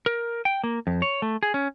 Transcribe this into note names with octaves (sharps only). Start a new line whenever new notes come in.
A#4
G5
A#3
F2
C#5
A3
G#4
C#4